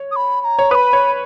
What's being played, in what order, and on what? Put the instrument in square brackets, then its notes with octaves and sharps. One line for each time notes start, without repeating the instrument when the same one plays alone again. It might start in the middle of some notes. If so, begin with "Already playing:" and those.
Already playing: [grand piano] C#5
[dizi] D#6
B5
B5
A#5
[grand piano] C#5
[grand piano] B4 [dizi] B5 D#6
[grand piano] C#5